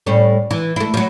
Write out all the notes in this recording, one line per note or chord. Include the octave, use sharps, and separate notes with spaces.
A2 G3 C#4
E3
A3 E4
F3 F#3